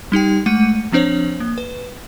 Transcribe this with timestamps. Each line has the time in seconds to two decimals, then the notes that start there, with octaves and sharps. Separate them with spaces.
0.12 G3 D#4 G4 G5
0.46 G#3 A3 F#5 C#7 D#7
0.92 F3 C4 D4 C5 C#5 F#7
1.40 A#3
1.58 B4